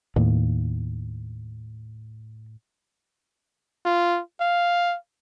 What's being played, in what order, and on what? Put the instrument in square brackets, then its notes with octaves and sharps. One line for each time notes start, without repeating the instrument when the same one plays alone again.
[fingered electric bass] D#2 [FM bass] A2
[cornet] F4
F5